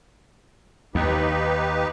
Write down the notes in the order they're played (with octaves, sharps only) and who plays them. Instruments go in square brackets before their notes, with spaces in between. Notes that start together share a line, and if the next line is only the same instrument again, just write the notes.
[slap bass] D#2 [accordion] D#4 G4 B4